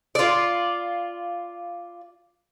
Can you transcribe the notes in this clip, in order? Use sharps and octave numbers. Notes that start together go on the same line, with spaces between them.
F4 D5